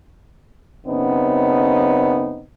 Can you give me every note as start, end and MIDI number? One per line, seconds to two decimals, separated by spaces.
0.86 2.44 42
0.86 2.44 49
0.86 2.44 59
0.86 2.44 60
0.86 2.44 63